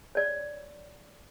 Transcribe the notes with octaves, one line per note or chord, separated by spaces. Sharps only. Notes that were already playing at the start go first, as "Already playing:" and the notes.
C#5 D5